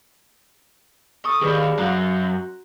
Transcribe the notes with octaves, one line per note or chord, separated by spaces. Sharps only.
A4 C#6 D#6
D#2 G#4 B4 D5
F#2 F#4 F5 A#5 F#6